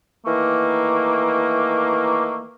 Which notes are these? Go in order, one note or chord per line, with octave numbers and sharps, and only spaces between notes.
D#3 E3 A3 A#3